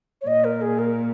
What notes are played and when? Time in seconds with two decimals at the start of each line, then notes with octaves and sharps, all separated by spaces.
0.21 C#5
0.27 A#2 D#5
0.44 A#4
0.62 G#4
0.79 A#4